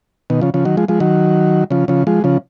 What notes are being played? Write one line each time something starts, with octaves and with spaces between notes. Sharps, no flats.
B2 D#3
C#3 F3
C#3 F3
D#3 F#3
F3 G#3
F3 G#3
D#3 F#3
C#3 F3
C#3 F3
F3 G#3
C#3 F3